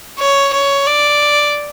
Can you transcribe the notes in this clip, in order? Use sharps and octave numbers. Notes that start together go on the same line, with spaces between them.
C#5
C#5
D5